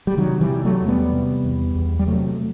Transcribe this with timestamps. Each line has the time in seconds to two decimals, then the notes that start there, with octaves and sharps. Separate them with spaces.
0.07 G3
0.17 C3 D#3 F#3
0.41 E3 G3
0.49 C3
0.65 F#3 A3
0.81 E2
0.88 G3 B3
1.12 C3
1.44 E2
1.75 E2
1.99 G3
2.08 C3 F#3 A3